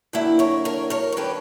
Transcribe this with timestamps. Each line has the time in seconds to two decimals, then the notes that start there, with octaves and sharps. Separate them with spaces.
0.13 D3 F#3 A#3 E4 G4
0.39 A#4 C#5
0.65 A#4 C#5
0.90 A#4 C#5
1.12 C#5
1.17 D3 F#3 C#4 G4 B4